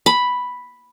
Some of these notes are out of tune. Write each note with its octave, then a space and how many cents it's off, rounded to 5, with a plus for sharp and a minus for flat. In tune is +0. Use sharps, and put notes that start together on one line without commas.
B5 +0